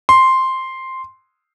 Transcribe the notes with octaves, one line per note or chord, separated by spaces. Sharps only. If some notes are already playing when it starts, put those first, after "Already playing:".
C6